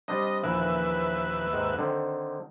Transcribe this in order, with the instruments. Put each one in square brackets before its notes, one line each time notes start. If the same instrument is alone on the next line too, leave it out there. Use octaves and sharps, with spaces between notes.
[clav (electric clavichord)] G3 C4 D4 [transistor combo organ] D#5
[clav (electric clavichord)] A#1 E3 A#4 [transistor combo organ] D#2 B4 E5
[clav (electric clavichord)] G#2 D#3
D3 D#3 C4